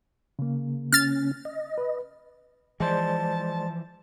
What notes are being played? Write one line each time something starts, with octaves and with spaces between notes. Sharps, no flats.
C#3 A#3
C#4 F6 A6
D#5
B4
E3 F3 G#3 C5 D5 A5